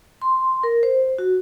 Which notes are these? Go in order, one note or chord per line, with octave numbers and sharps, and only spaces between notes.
C6
A#4
C5
F#4